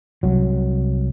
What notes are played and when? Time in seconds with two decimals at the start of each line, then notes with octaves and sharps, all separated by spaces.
0.23 C2 F#3